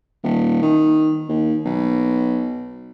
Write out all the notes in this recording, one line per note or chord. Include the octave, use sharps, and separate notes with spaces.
D#1
D#3
D#2
B1